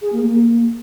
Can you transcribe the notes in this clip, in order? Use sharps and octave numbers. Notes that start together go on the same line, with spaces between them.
G#4
A#3
A#3